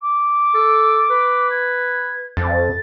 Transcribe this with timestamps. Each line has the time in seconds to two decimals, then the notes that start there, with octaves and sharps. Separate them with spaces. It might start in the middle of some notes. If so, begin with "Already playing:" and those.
0.01 D6
0.54 A4
1.10 B4
1.50 G#6
2.37 F2 A6